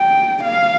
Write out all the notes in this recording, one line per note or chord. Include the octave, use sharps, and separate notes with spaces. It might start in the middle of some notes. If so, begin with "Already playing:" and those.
Already playing: G5
F5